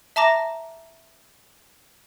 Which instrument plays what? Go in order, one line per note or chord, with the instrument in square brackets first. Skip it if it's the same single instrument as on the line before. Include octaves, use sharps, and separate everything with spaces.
[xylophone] E5 A5 A#5 D6 A#6